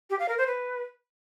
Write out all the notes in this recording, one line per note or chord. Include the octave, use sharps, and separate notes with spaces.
G4
F5
A#4
C5
B4